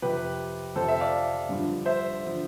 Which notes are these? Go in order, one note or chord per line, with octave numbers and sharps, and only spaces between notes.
F2 C3 F3 G4 B4
F2 C3 F3 A4 C5
C5 E5
D5 F5
G2 D3 F3
C5 E5
D3 F3